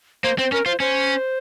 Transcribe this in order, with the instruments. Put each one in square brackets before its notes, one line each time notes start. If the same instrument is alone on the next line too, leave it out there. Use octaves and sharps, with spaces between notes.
[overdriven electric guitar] A#3 [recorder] C5
[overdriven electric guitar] C4 [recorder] C5
[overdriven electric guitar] C#4 [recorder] A#4
[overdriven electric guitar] F4 [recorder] C5
[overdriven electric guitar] C#4 [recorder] C5